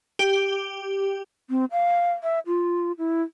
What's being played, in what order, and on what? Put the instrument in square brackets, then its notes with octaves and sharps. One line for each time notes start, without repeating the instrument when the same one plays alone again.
[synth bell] G4
[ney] C4
F5
E5
F4
E4